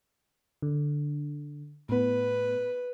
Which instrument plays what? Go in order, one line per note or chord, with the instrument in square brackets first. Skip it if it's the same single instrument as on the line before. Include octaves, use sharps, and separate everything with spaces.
[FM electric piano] D3
[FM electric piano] A2 B3 [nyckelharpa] B4